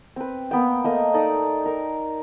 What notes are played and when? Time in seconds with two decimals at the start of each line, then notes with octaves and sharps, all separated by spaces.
0.16 C4 B4
0.51 A#3 B3 G5
0.84 A3 A#3 D#5
1.14 D#4 A4 D5 D#6
1.66 A#4